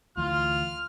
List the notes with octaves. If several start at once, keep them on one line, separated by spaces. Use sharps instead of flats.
D2 E3 F4 F6